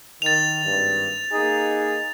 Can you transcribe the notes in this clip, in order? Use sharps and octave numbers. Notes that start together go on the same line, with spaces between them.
D#3 A6 F7
G#1 G2
A#3 D#4 G#4